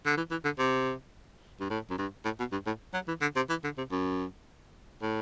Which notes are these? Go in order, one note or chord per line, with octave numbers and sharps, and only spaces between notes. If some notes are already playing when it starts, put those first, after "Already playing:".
D3
E3
E3
D3
C3
G2
A2
F#2
G2
A2
B2
G2
A2
F#3
E3
D3
C3
E3
D3
C3
F#2
A2